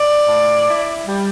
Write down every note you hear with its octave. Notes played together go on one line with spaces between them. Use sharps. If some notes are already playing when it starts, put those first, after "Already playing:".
Already playing: D5
A2
E4
G3